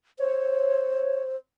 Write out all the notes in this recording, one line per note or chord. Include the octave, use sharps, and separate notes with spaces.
C5 C#5